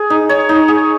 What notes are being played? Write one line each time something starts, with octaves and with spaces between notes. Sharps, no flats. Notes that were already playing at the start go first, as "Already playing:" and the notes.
Already playing: G#4
D#4
C#5
D#4
G#4